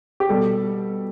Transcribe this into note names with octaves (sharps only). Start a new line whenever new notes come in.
G4
B2 G3 A4